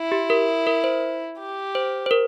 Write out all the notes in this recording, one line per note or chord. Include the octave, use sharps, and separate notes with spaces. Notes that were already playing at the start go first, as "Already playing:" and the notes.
Already playing: E4
G4
A#4
A#4
C5
G4
C5
C5
A#4